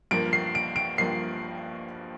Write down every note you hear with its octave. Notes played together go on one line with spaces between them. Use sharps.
G2 F3 A#3 D7
C7
D7
D7
G2 F3 A#3 C7